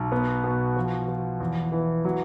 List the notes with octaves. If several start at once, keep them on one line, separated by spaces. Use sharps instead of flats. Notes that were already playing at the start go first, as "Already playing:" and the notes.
Already playing: B1
B3
B2
F3
F3
E2
E3
F#3